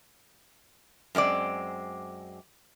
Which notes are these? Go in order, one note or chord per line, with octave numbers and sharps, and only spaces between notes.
F#2 G#3 C4 D5